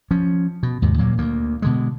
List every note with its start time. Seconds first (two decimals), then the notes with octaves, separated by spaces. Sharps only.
0.11 F3 C#4
0.63 B2
0.82 D#2 G#2 C3
0.98 A#2 F#3 A#3
1.18 D2 A#3
1.62 B2 D3 G#3